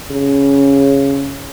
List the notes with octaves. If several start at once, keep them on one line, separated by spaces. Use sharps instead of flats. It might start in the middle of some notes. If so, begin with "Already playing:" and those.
C#3